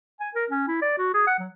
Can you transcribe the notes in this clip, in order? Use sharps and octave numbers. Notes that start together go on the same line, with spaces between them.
G#5
A#4
C#4
E4
D5
F#4
G#4
F#5
F#3